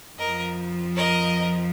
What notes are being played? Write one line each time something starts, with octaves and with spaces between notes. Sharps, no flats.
F2 F3 A#4 D#5
A#4 D#5